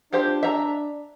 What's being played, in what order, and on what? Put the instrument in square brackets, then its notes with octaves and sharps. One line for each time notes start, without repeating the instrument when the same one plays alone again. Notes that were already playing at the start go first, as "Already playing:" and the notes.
[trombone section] D4 [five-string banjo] F4 G4 C5
[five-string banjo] E5 A#5